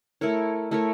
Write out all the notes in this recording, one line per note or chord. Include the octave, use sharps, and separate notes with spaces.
A3 E4 A#4 C#5
A3 E4 A#4 C#5